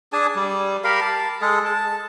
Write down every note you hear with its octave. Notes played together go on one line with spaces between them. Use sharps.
D4 G#4 G#5 A5
G3
G4 A#4 F5 B5
A5
G#3 G#4 A4
A5